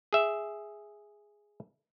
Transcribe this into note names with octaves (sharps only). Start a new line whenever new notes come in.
G#4 E5